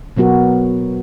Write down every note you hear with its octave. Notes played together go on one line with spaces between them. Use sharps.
B2 F#3 B3 F#4 A#4